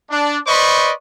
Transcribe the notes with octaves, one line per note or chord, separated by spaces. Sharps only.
D4
B4 C5 D5 D#5 B5 C#6